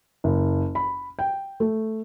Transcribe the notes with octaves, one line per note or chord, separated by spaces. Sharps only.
F#1
B5
G5
A3